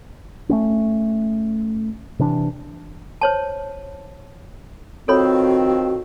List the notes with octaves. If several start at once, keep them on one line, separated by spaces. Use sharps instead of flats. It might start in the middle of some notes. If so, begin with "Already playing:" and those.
A3 B3 C#4
C3 E3 D4
C5 C#5 A5
D#3 F3 C4 F#4 A4 C#5 B5